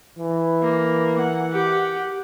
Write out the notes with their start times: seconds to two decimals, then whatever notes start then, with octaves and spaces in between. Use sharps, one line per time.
0.19 E3
0.62 A#3
1.20 F#5
1.53 G4